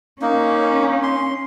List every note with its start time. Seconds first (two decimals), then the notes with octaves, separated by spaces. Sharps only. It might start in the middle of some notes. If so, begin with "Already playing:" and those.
0.22 A#3 C#4 D#4
1.03 C6